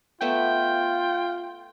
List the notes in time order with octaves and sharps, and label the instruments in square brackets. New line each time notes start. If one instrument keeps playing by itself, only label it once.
[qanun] A3 B3 E5 [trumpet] F4 [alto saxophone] G5